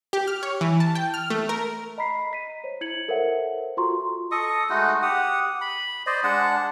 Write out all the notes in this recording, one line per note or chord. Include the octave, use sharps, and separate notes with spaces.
G4
F6
C#5
E3
A5
G5
F6
A3
A#4
D#5 A#5 B5 B6 C7
D#5 B6 D#7
C5 C#5
E4 G#6 C#7 F#7
A4 A#4 C5 C#5 E5 F#5
F4 F#4 A4 A#5 C6 C#6
A4 D#5 C#6 D#6
G#3 A3 D#4 F#4
G4 F#5 D#6
B5
C5 D5 D#5
G#3 D4 F#5 A5